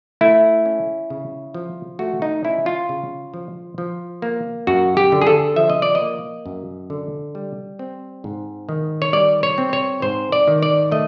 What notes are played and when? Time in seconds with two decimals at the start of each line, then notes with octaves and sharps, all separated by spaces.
0.21 A3 E4
0.66 C#4
1.10 C#3
1.54 F3
1.99 A3 F#4
2.22 D#4
2.44 C#4 E4
2.66 F4
2.89 C#3
3.34 F3
3.78 F3
4.22 A#3
4.67 F#2 F#4
4.97 G4
5.12 D3
5.22 G#4
5.27 A4
5.56 F3 E5
5.70 D#5
5.82 D5
5.95 D#5
6.01 A#3
6.46 F#2
6.90 D3
7.35 G3
7.79 C4
8.24 G#2
8.69 D#3
9.02 C#5
9.13 G3 D5
9.43 C#5
9.58 C4
9.73 C#5
10.02 G#2 C5
10.32 D5
10.47 D#3
10.63 D5
10.91 A3 D#5